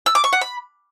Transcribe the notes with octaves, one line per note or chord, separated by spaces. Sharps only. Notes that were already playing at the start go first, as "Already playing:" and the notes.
E6
D6
C#6
F#5
B5